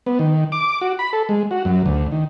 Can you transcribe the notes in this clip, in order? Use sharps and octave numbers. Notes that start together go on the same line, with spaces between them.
B3
D#3
D6
F#4
B5
A4
G#3
F#4
F#2
D2
D#3